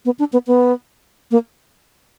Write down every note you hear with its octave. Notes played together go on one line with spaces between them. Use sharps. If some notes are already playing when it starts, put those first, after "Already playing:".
B3
D4
B3
B3
A#3